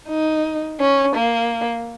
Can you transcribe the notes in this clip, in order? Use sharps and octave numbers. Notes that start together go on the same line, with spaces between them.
D#4
C#4
A#3